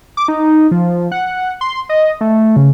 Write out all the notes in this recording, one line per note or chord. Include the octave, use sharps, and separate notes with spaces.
D6
D#4
F3
F#5
C6
D#5
A3
C#3